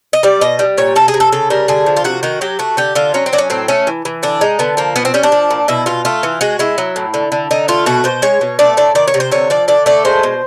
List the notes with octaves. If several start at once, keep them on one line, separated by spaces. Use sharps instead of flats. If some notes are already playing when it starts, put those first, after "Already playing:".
D#5
G3 D5
B2 D#5
G3
A#2 C#5
C3 A4
G#4
C3
A4
C#3 A4
G3 A#4
D3 G#4
F3
F4
C3 F#4
D#3 F#4
F#3 G4
A3 F#4
D3 G4
D3 F4
F#3 C#4
C4
F#3 D4
C#4
A2 C4
A3 C#4
E3
E3
D3 D4
G#3 D#4
D3 B3
F3 A#3
B2 B3
C4
G3 C#4
D4
F3
A#2
B2 E4
B2 F4
A3 F4
E3
G#3 F#4
G#3 E4
F#3
A2
D3
D3
D3 D#4
A3 F4
B2 F#4
B2 C5
G#3 C#5
B2
A3 D5
A2 D5
D#3 D5
C#5
C3
C5
D3 C#5
F3 D5
D3 D5
A3 D5
G#3 C5
B2